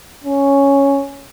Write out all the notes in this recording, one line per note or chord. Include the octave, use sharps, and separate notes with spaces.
C#4